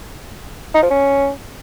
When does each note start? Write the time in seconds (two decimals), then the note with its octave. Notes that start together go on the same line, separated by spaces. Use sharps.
0.75 D#4
0.83 F3
0.90 C#4